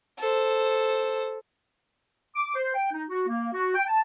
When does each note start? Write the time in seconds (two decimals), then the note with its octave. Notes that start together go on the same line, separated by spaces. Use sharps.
0.19 A4 C5
2.36 D6
2.55 C5
2.75 G5
2.92 D#4
3.09 F#4
3.27 A#3
3.53 F#4
3.75 G5
3.86 A5